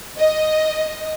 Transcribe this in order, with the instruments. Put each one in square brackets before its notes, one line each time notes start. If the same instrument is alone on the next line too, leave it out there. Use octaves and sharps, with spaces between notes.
[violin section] D#5